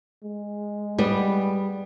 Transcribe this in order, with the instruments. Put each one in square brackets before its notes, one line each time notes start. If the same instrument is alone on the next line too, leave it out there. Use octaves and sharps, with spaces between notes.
[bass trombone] G#3
[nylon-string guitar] G3 B3